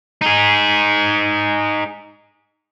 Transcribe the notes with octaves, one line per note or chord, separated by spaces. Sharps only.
D#4 G#4